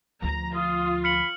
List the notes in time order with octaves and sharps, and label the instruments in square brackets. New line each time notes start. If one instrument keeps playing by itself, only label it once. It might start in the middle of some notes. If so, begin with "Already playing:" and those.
[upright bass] D2 F3 [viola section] A#5
[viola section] F4 [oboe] D#6
[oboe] B5 [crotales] F6 C#7 F#7